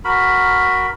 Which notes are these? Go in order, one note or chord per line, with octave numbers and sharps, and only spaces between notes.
F#4 A#4 B5